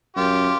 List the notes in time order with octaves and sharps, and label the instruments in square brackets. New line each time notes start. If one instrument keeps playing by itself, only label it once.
[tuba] F#2 [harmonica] F4 G4